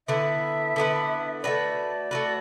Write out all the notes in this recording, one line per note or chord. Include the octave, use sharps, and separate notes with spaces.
D3 B3 E4 B4 E5
D3 B3 E4 B4
A3 F#4 B4 D5
A3 F#4 B4